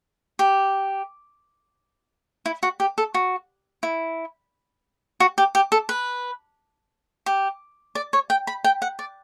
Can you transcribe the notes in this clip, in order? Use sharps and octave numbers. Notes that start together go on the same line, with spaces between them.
G4
E4
F#4
G4
A4
F#4
E4
F#4
G4
G4
A4
B4
G4
D5
C#5
G5
B5
G5
F#5
D5